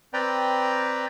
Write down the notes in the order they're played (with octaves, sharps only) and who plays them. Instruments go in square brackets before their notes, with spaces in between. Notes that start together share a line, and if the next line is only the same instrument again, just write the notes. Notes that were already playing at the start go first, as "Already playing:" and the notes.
[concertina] C4 B4 D5 G5 A#5